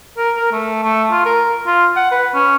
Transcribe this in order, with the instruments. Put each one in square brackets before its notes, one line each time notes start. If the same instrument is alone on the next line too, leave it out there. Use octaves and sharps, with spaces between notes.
[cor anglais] A#4
A#4
A3
A3
F4
A#4
F4
F#5
B4
C#4